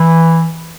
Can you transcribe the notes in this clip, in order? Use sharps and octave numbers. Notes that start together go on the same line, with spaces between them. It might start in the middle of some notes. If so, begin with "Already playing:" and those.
Already playing: E3